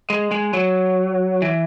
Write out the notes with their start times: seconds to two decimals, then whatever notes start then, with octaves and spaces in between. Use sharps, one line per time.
0.10 G#3
0.31 G#3
0.53 F#3
1.42 E3